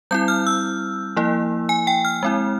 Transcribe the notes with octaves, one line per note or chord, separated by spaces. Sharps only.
G3 C4 E4 G6
F6
E6
F3 A#3 E4
G#5
G5
F6
G#3 C4 E4